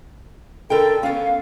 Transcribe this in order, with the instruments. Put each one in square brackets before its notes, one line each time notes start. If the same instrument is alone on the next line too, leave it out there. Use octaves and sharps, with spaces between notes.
[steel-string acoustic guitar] D3 A#4 G5 [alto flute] A4
[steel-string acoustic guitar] B3 C#4 [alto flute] F5